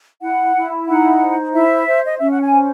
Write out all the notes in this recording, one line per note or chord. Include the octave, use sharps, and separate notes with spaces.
E4 F#5
E4
D#4 F#5
C5
E4 E5
C5
D#5
C#4 E5
F#5
G#5
C5